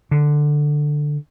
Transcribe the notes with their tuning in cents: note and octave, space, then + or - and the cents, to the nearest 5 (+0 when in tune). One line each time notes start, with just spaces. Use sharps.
D3 +10